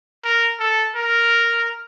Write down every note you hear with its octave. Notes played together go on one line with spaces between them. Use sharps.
A#4
A4
A#4